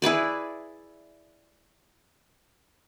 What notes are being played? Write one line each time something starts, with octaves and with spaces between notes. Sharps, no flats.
E4 G#4 B4 D5